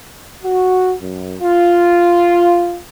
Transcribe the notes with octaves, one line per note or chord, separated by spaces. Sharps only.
F#4
F#2
F4